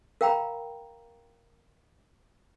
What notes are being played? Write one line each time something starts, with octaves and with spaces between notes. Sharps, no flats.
A#4 F5 G5 A#5 B5